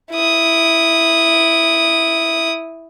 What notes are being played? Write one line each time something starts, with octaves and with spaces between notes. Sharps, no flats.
E4 D#6